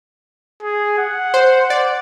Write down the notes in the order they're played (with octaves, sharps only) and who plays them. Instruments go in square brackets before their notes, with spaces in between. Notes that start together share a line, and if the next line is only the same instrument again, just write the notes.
[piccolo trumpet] G#4
F#5
[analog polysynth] C5
D5